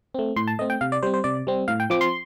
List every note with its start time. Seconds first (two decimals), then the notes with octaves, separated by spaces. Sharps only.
0.14 A3 C4
0.36 A2 C6
0.47 A5
0.59 A3 C4 D#5
0.70 G5
0.81 C3 F5
0.92 D5
1.03 G3 C4 C5
1.14 C5
1.24 C3 D5
1.47 G3 C4
1.68 A2 F5
1.80 G5
1.90 F3 C4 D6
2.01 C6